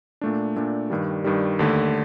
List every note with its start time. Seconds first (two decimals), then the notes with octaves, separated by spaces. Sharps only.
0.21 A#2 A3 D4
0.56 A#2 A3 D4
0.90 G2 D#3 G3
1.24 G2 D#3 G3
1.59 D#2 D3 A3